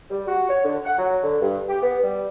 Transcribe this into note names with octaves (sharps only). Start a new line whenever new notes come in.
G3
F#4
C#5
D3
F#5
F#3
D3
G2
G4
B3
G3